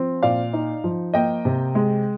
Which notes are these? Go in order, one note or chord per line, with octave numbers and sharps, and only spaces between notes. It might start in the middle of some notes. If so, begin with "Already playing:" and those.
Already playing: F3 C4
A#2 D5 F5
D#4
F3
A#3 D#5 G5
C3
G#3